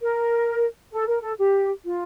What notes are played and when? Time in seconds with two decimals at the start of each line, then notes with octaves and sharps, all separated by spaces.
0.01 A#4
0.93 A4
1.07 A#4
1.21 A4
1.38 G4
1.84 F4